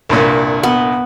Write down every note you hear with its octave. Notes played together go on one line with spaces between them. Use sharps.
C2 G2 A#2
B3